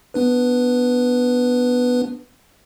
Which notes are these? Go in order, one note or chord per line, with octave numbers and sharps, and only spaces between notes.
B3 D4 B4